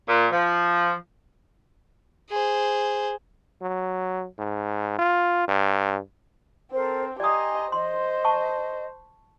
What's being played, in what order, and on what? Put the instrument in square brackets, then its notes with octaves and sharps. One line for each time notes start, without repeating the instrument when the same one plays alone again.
[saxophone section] A#2
F3
[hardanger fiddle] G#4 C5
[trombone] F#3
G#2
F4
G2
[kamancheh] C4 [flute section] A4 A#4 C5
[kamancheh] G4 D#5 [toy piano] D5 D#6 [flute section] G#5 A#5 C6
[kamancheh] C5 [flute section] D#5 [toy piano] C6
[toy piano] A5 C#6